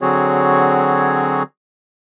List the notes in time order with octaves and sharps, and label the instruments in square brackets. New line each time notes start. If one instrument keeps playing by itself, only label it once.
[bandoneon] D3 F#3 C4 F#4 G#4 C#5